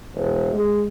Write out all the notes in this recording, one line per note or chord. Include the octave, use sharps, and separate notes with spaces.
E1
G#3